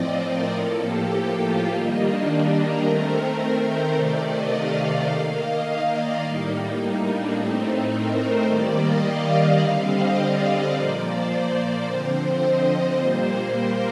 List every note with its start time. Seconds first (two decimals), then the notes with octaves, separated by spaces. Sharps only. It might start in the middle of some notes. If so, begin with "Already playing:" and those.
Already playing: A2 F3 C4 D5 D#5
0.26 A#4
0.54 A2 F3 A#3 A4
0.82 G4
1.39 F4
1.67 D#3 G3 A#3 D#4
1.95 D4
2.52 A#4
2.79 D#3 A3 C4 A#4
3.65 C5
3.93 C3 D#3 A3 D5
4.21 D#5
4.49 F5
4.78 D#5
5.06 D#3 A#3 F5
5.34 D#5
5.90 D5
6.19 A2 G3 A#3 D#4
6.47 D#4
6.75 D#4
7.04 D4
7.32 A2 A3 C4 D#4
7.60 D#4
7.88 A#4
8.17 C5
8.45 D#3 G3 A#3 D5
8.73 D#5
9.01 F5
9.58 D3 G3 C4
9.86 D#5
10.14 D5
10.70 A#2 F3 A#3
10.99 C5
11.27 C5
11.56 C5
11.84 D3 F3 C4 C5
12.12 C5
12.40 D#5
12.68 D#5
12.97 A#2 G3 A#3 C5
13.53 A#4